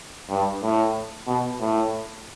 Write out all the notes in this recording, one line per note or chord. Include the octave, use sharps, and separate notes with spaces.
G2
A2
B2
A2